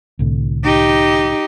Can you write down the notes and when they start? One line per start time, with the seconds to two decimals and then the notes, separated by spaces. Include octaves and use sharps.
0.19 C2 A2 D3
0.64 D#4 G4